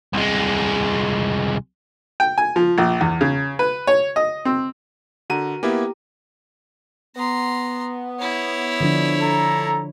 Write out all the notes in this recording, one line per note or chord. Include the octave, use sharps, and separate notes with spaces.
C2 G#3
G5
G#5
F3
A#1
E2
C#3
B4
C#5
D#5
C4
D3 F#4 A#4 D#7
A#3 B3 E4 G4
B3 A#5 C6
E4 C#5
D3 F3 D4
A4 A#5